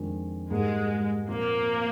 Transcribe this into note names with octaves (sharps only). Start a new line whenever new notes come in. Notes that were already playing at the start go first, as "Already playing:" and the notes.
Already playing: F2 D#3 G#3 D4
G#2 G3 G#3 A#3 D#4 G#4
A#2 F3 A#3 C4 F4